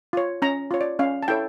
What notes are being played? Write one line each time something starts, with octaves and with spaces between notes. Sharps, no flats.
F4 C#5
C#4 A#5
F4 C#5
D5
C#4 F5
A5
E4 A4 C#5 G5